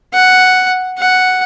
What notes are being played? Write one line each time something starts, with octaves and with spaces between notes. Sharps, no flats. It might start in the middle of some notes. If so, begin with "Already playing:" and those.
F#5
F#5